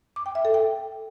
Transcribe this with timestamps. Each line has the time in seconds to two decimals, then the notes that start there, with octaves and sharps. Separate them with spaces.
0.16 D6
0.26 G5
0.35 E5
0.45 A4
0.54 G5